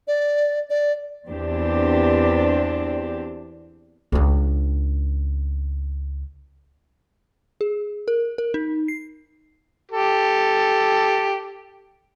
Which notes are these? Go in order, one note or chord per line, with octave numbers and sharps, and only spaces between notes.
D5
D5
E2 C4 D4 G4
C#2 D4
G#4
A#4
A#4
D#4
C7
G4 A4